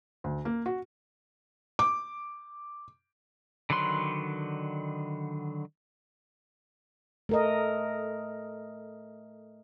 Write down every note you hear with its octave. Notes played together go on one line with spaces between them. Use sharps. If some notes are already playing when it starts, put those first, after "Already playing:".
D2
A#3
F#4
D6
D3 D#3 F#3 B4 C6
A3 A#4 D#5